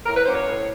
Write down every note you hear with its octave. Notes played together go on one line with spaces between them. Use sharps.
A2 A#4
B4
F#3 A#3 C#4 C5
C#5
A2